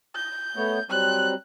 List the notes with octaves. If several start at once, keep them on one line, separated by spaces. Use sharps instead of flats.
G6
A3 B3 C#5
F#3 G3 C4 F#6